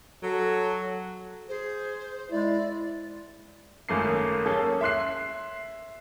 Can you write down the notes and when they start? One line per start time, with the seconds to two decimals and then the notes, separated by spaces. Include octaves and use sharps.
0.23 F#3 A4
1.48 G#4 C5
2.31 G#3 E4 D5
3.89 G#1 F#2 A3 A#3 C7
4.46 A#3 C#4 G#4 A4
4.81 E5 C6 F#6 C7